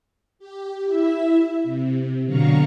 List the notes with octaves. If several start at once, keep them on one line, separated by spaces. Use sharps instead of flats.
G4
E4 E5
C3
B2 D3 F#3 F5 A#5 C#6